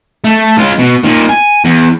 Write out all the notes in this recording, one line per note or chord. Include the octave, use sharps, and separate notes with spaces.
A3
G#3 F4
B2
A#2 D#3
G#5
E2